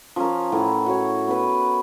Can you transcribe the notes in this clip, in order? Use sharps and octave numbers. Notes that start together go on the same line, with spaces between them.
F3 C#4 A#4
A2 E3 F#5
F#4 C#5
B3 B4